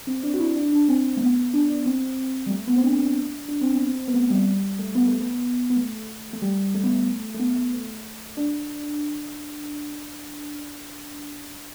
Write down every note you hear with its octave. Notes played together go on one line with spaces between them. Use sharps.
C4
D4
F#4
E4
D4
D4
C4
A3
B3
D4
D4
C4
G3
A3
B3
C4
D4
D4
C4
B3
C4
B3
A3
G3
A3
B3
A3
B3
B3
A3
A3
G3
A3
B3
A3
A3
B3
A3
D4